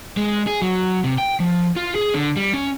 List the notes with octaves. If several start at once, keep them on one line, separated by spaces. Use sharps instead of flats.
G#3
G#4
F#3
C3
G5
F3
F4
G#4
D3
G3
C#4